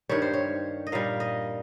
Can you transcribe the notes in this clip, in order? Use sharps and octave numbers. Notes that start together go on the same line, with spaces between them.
G2 D#3 G3 C#5
C5
C#5
D#5
A#2 G3 F5
D#5